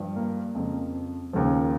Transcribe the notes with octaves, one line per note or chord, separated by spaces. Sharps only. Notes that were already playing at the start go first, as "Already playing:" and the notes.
Already playing: G2 F3
A#3
F2 C#3 F3
D#2 C#3 F3